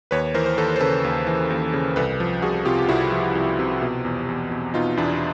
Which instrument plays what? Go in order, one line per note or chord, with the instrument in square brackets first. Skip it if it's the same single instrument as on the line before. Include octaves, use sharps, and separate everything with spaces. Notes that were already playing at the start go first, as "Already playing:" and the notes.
[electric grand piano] D#2 B4 C#5
E3 A#4 C5
C5
D#2 A4 B4
C5
C#3 A4 B4
D#2
E3
D#2
C#3
C2 A4 B4
F3
C2 F#4 G#4
C3 F4 G4
G4
C2 E4 F#4
F3
C2
C3
B2
E2
E2
B2
B2 D#4 F4
E2 D4 E4